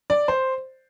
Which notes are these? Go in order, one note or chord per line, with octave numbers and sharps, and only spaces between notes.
D5
C5